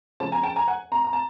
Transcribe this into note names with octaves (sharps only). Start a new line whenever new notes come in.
C#3 F3 A3 A5 B5
G#5 A#5
G5 A5
G#5 A#5
F#5 G#5
A#5 C6
A#5
A5